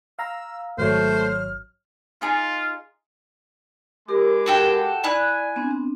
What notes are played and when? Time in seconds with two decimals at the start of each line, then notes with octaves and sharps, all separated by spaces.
0.19 F5 A#5 E6
0.78 G#1 F#3 A3 C5 C#5 F6
2.22 D#4 F4 G#4
4.08 G#3 G4 A#4 B5 D6
4.46 F#4 A4 G5
5.04 E4 D5 G#5 F#6
5.56 B3 C4 D4